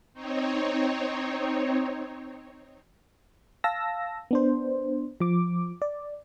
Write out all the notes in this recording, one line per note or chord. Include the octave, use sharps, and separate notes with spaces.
C4 D#4 C#5
F5 A5 E6 A#6
B3 D4 C5
F3 D6
D5